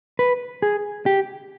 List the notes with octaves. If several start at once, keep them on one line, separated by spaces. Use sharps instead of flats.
B4
G#4
G4